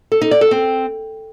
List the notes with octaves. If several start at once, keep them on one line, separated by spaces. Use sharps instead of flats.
A4
D#4
D5
A4
C4